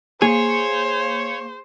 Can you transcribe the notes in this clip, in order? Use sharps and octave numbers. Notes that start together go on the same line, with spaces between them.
A#3 G#4 C5 C#5